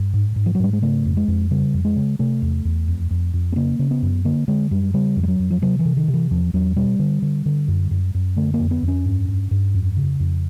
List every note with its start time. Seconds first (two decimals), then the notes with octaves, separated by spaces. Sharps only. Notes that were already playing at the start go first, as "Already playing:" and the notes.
Already playing: G2
0.13 G#2
0.36 G#2
0.46 F3
0.55 F#3
0.60 G#2 G3
0.73 G#3
0.82 C#3 A3
1.05 F2
1.17 G#3
1.28 F2
1.51 C#3 G3
1.74 F2
1.85 G#3
1.96 C#3
2.19 C3 A3
2.42 E2
2.65 E2
2.88 F2
3.11 F2
3.34 F2
3.52 B3
3.56 C#3 A#3
3.79 C#3
3.91 B3
4.02 F#2
4.25 D3 A#3
4.48 D3 G#3
4.71 F#2 G3
4.94 C#3 G3
5.16 F2
5.23 G3
5.28 F#3
5.39 F2
5.50 F3
5.62 C3 F#3
5.79 E3
5.85 C3
5.97 D#3
6.08 C3
6.14 E3
6.31 E2 F3
6.54 E2 F#3
6.76 B2 G3
6.99 D3
7.22 D3
7.46 D3
7.68 F#2
7.91 F#2
8.14 F#2
8.36 D3 A3
8.54 A#3
8.59 F2
8.71 B3
8.83 F2
8.88 C#4
9.06 G2
9.28 G2
9.51 G2
9.74 F2
9.97 C#3
10.20 F2